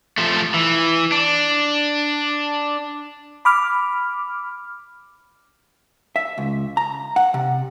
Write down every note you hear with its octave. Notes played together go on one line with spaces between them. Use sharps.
F3 A3
E3
D4
B5 D6 F6
E5
C#2
A#5
F#5
C3